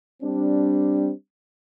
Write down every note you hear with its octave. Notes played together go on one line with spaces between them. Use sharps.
G3 C4 D4